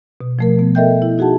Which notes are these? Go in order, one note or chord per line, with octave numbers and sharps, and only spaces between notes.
B2
F3 A3 A#4
B3
A4 A#4 D#5 E5 G5 G6
E4
D#4 F#4 G#4 F#5 A5